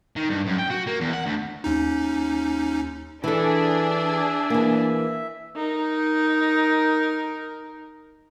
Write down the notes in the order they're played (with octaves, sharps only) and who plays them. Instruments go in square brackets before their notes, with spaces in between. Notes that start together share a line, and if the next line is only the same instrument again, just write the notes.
[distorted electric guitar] D#3
G2
F#2
G5
F#4
A#3
E2
F#5
D2
[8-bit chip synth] D#2 C#4 D#4
[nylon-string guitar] E3 A4 [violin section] D4 G#4 [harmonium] E5
[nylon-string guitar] E3 A#3
[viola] D#4 A#4